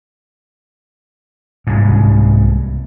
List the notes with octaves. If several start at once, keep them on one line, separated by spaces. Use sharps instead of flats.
C2 G#2